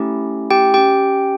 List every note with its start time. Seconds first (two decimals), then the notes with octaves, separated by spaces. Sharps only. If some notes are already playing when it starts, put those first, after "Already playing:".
Already playing: A3 C#4 E4 G4
0.50 G4 G5
0.74 C#4 G4 G5